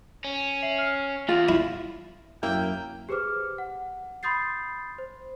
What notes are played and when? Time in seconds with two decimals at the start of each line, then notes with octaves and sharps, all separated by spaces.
0.24 C#4
0.63 E5 C7 F#7
0.78 F6 C7
1.29 E2 F4
1.49 E4
2.43 F#2 A#3 E4 G5
3.09 G4 G#4 B4 C5 D6 F6
3.58 F#5
4.23 B5 C6 D#6 G6 A6 C7
4.98 C5